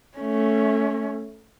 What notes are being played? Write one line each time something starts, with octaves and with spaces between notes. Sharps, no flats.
A3 C#4